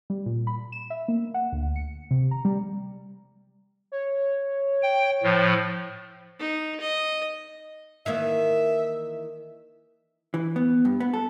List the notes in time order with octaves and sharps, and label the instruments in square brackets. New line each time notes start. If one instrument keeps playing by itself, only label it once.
[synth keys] G3
A#2
B5
E7
E5
A#3
F#5
D2
C#7
C3
A#5
G3
[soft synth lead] C#5
[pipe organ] G5
A2 F3
[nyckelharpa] D#4
D#5
[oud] D#3 E3 A#3 [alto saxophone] E5
[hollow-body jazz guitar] E3
B3
G2
B3
A4